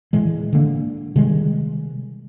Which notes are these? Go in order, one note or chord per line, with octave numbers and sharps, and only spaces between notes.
A2 E3 G#3
D3 A#3
C3 D#3 G3 G#3